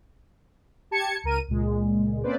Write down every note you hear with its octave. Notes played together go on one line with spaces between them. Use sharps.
G4 A5 G#6 C#7
C#2 A#4 D#7
C#2 A#2 G#3
A#3 C4 C#4 B4 C5 D5